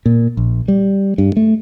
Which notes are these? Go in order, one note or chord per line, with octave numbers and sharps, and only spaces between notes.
A#2
A#1
G3
G2
A3